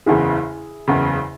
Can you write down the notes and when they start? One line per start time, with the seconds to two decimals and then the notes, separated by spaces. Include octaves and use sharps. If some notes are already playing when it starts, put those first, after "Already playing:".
0.06 F#1 E2 C#3 E4 G#4
0.88 F#1 E2 C#3